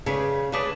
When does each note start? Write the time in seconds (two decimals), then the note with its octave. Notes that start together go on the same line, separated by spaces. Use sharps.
0.06 C#3 A3 D4 G#4 B4
0.52 C#3 A3 D4 G#4 B4